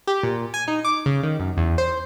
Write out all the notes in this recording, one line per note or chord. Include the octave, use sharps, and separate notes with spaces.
G4
A#2
G#5
D#4
D6
C#3
D#3
F#2
E2
C5